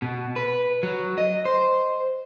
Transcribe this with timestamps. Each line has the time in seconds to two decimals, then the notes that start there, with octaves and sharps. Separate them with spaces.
0.02 B2
0.36 B4
0.83 F#3
1.18 D#5
1.45 C5